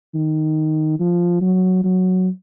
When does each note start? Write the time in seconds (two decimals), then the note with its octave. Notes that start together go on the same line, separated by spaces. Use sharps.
0.14 D#3
1.00 F3
1.41 F#3
1.84 F#3